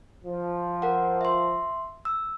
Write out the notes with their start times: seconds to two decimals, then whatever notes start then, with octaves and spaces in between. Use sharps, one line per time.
0.24 F3
0.82 A#4 F#5
1.21 E5 C6
2.05 E6